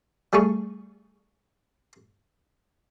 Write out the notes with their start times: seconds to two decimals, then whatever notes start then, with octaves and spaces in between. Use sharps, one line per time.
0.33 G3 A3 G#4 C#6